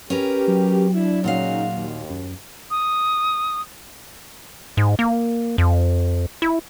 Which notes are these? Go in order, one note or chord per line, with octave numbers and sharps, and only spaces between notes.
C#4 G4 A#4 B4
F#3
D4 E4
A#2 C#3 C#4 D#4 F#4 F5
D#2
F#2
D#6
G#2
A#3
F2
E4